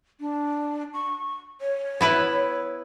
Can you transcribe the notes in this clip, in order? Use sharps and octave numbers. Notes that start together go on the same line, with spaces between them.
D4
C#6
C#5
B3 E4 B4